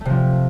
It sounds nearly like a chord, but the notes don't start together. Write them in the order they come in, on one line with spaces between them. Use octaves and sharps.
A3 C3 F3